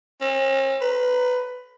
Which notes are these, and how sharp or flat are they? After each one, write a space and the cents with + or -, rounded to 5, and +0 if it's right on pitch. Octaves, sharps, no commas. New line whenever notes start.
C#4 -45
B4 +15